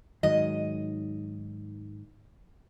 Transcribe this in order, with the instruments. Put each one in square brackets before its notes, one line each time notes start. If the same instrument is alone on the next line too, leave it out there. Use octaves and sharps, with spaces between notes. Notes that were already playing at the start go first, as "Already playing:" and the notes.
[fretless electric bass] G#2 D#3 F#3 [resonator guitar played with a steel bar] D#5